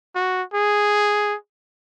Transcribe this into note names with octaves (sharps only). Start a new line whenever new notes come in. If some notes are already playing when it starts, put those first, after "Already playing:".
F#4
G#4